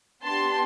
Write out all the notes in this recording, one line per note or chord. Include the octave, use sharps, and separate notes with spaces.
B3 D4 G4 A5 C6